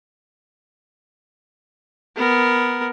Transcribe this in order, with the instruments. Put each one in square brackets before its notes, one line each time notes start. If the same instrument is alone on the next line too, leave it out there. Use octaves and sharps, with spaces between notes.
[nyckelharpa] B3 A#4